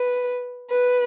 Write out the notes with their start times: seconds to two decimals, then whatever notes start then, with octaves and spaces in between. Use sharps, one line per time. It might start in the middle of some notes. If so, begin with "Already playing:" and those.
Already playing: B4
0.71 B4